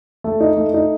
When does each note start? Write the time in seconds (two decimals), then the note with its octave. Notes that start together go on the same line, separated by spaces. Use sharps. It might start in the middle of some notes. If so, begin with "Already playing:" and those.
0.24 A3
0.40 D#4
0.57 A3
0.74 D#4